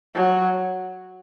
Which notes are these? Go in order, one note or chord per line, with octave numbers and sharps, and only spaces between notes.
F#3